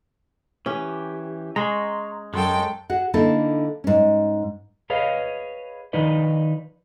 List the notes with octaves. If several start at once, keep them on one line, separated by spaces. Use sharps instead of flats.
E3 C#4 G4
G#3 A#5 C6 C#6
F#2 G#3 A4 G5 C6
F#4 G#4 F#5
D3 A#3 D#4 E4 A4
G#2 C#4
G#4 B4 C#5 D#5 F5
D#3 F3 D#4 B4 D5 D#5